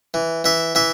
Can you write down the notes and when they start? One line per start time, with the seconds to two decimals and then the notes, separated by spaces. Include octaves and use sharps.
0.14 E3
0.44 E3 E5
0.75 E3 E5